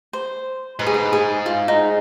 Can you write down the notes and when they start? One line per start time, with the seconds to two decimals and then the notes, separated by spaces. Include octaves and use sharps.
0.13 C5
0.79 G#2 B4
0.87 G#4
0.94 B4
1.13 G#4
1.46 F4
1.68 D#4